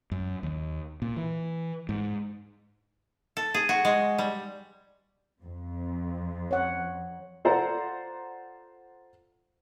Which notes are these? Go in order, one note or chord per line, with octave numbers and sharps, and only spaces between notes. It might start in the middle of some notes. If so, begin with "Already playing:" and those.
F#2
D#2
A#2
E3
G#2
A4
G#4
F#4
G#3
G3
F2
C#5 F#5
F4 A4 C5 D5 F#5 A#5